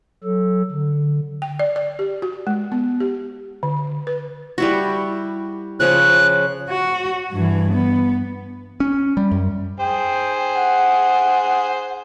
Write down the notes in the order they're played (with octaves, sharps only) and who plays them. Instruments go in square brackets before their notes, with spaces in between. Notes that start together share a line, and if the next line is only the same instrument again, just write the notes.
[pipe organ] F#3 A4
D3
[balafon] G5
D5
D5
G4
F#4
G#3
B3
G4
D3
B4
[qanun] G3 E4 F#4
[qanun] C#3 F3 C#4 [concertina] F#6
[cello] F#4
G2 E3
B3
[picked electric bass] C#4
G3
F#2
[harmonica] G#4 C5 [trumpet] G5
[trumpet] F#5